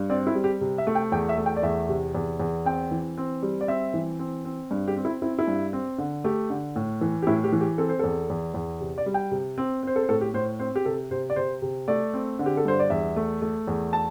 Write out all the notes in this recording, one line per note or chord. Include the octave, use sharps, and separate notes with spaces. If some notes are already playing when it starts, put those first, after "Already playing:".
Already playing: G2
C4 D5
E4
G3
G4
C3
E5
A3
G5
E2 G5
E5
A3
G5
D5
E2 E5
C3
E2
E2
C4 G5
E3
C4
G3
D5
C4 E5
E3
C4
C4
G2
G4
C4
E4
C4 E4
E4
G2
C4
D3
A3 G4
D3
A2
E3
G4
A2 E4
G4
E3
G4
C4 A4
C5
E2 A4
E2
E2
C3
D5
G3
G5
C3
C4
C4 C5
A4
C5
A2 A4
G4
A2 C5
C4 C5
G4
C3 A4
C3 C5
D5
C3 C5
C3
A3 D5
C4
D3
G4
A4
G2 C5
D5
E2 E5
A3
A3
E2
A5